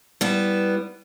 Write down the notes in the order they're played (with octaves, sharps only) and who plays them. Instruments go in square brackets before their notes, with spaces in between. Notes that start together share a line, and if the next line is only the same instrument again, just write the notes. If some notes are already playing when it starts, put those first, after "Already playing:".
[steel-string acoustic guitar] G3 B3 E4